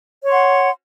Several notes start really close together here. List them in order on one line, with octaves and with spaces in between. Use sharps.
C#5 C6 F#5